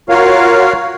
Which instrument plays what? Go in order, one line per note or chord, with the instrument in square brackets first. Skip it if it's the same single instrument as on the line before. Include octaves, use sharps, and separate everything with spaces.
[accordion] F4 F#4 A#4 C#5 F5